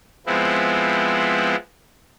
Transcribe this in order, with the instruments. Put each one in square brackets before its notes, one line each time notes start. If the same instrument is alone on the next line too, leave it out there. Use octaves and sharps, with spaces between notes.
[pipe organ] F3 G#3 B3 C4 E4